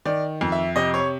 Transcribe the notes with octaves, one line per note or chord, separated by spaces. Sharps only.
D#3 D5
F2
E5
C3 D#5
C#5